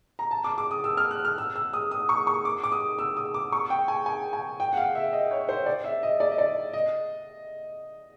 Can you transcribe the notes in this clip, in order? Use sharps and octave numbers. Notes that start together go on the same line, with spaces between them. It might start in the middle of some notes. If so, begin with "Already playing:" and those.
A#5
A5
D6
D6
D#6
E6
F6
F#6
F6
E6
E6
D#6
D#6
C#6
C#6
D6
D6
D#6
E6
D#6
D6
C#6
G5
G#5
G#5
G#5
G5
F#5
F5
E5
D#5
C#5
C5
D5
E5
D#5
D5
D#5
D5
D#5